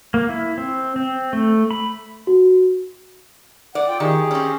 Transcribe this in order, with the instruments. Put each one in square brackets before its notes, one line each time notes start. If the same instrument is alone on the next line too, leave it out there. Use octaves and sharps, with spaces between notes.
[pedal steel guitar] A#3
E4
C4
C4
A3
B5
[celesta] F#4
[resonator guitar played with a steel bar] D5 [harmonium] F#5
[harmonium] F4 G5
[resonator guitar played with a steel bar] D#3 [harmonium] G4 G#4
[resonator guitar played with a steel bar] C4 C#4